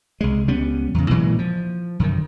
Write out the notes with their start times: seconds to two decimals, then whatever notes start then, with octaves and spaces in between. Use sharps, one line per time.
0.21 C2 G#3
0.48 C#2 G3 B3 C#4
0.94 E2 C#3
1.10 A#2 E3 F#3 G#3
1.39 F3
1.99 F#2 D3 D#3